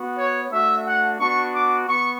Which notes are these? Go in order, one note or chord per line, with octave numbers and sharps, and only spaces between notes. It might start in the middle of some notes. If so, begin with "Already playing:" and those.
Already playing: B3 F#4
C#5
A3 D4 F#4 E5
F#5
B3 D4 F#4 C#6
D6
B3 C#6